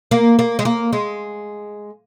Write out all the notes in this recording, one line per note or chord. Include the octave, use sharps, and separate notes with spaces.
A#3
A#3
G#3
A#3
G#3